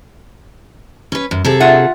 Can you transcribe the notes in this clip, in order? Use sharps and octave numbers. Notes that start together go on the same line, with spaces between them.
C#4 B4
F#2
C3 G#4 A4
F4 E5 F#5